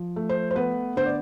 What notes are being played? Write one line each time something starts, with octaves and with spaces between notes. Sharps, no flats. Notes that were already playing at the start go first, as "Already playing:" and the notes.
Already playing: F3
A3
C5
C5
B3 B4
D3 C5
D5